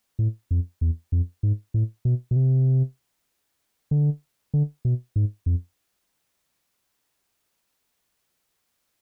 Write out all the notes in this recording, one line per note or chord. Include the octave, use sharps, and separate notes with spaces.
A2
F2
E2
F2
G#2
A2
B2
B2
C3
D3
D3
B2
G#2
F2